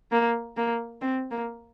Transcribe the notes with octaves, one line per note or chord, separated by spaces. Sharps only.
A#3
A#3
C4
A#3